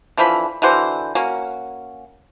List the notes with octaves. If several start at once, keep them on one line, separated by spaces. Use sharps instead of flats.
D3 E3 F3 B5
D3 E3 F#4 C5
A#3 C#4 F#4